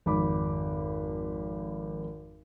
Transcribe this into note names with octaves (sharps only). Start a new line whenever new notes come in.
G#1 F2 B5 D6